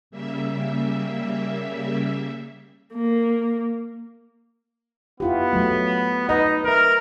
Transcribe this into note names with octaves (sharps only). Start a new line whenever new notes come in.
C#3 G3 A#3 E5
A#3
B3 E4 F4 G4
F#3 A3
D#4 B4 D#5
A#4 B4 E5